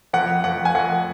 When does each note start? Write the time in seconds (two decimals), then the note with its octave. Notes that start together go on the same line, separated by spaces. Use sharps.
0.13 F2 F#5
0.44 F2 F#5
0.65 G#5
0.75 F2 F#5